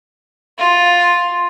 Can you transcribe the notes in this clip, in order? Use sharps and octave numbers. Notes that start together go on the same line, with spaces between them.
F4